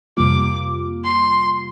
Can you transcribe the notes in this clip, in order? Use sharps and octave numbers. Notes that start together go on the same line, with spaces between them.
F2 C3 G3 A#3 F4 D6
C6